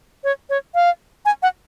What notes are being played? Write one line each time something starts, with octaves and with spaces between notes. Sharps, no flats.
C#5
C#5
F5
G#5
F#5